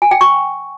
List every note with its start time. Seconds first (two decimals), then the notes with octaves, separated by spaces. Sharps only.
0.02 G#5
0.11 G5
0.21 C#6